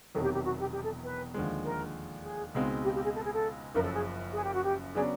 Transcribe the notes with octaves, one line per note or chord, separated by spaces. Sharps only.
E1 E2 C3 D#3 F#3 A4
G4
G4
F#4
G4
G4
A4
B4
D#2 D3 F3 G#3
A#4
G#4
C#2 B2 G#3 C4 D#4
G4
G4
G#4
A4
G#4
A4
F#1 F#2 C#3 F3 A#4
A4
G#4
G#4
G4
F#4
G4
C#3 F#3 B3 D4 G#4